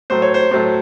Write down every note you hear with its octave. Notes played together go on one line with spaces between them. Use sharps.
A2 F#3 A3 C5
C#5
C5
A2 F#3 A3 C5